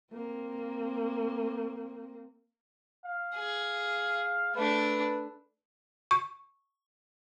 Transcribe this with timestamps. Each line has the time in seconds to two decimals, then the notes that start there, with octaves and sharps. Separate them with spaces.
0.13 A#3 C4
3.05 F5
3.35 G#4
4.55 A3 D4 B4
6.11 C#6